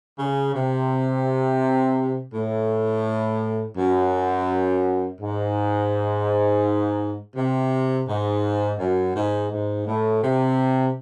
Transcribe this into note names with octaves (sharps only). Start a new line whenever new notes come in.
C#3
C3
A2
F#2
G#2
C3
G#2
F#2
G#2
G#2
A2
C3